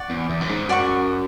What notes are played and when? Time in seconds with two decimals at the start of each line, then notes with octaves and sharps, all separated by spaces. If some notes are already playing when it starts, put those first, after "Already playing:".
Already playing: D5 F#5 C#6
0.10 E2
0.30 E2
0.41 F#2
0.49 G#2
0.69 F#2 D5 F#5 C#6